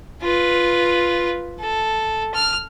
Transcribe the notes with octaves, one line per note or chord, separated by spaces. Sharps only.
F4 B4
A4
F6